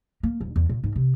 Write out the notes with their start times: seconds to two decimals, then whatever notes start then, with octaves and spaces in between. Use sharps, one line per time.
0.23 A#3
0.41 D#1
0.56 E2
0.69 A#2
0.84 G#2
0.96 C3